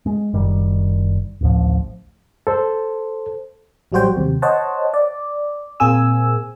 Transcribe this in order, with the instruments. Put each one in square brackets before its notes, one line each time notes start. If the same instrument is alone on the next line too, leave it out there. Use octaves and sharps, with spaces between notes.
[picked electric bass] G#3
F#1 D#3 G3
D1 A1 F3
[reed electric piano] A4 C5
[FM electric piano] A1 F#3 G3 F#4 C5 G5
D#2 C3
C5 C#5 D#5 F#5 A5
D5
A#2 A#3 C4 G#4 G#5 E6